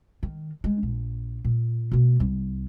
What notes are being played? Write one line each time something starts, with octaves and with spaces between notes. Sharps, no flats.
D#3
G#3
A#1
A#2
B2 A#3
C2